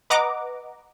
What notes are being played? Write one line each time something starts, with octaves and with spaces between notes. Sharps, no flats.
B4 D#5 F#5 A#5 D6